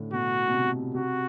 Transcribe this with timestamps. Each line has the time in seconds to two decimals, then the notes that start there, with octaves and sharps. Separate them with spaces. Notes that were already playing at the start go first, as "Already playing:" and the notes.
Already playing: A2 D3
0.13 B2 F#4
0.48 B2
0.54 C3
0.94 C3 F#4